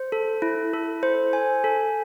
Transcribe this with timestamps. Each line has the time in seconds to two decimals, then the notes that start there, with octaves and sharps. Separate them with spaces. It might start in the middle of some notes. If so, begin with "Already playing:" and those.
Already playing: C5
0.12 A4
0.42 E4
0.74 A4
1.03 C5
1.33 G#5
1.64 A4